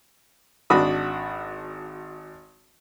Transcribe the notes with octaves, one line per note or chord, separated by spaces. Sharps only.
G#1 D4 F#4 B5 D#6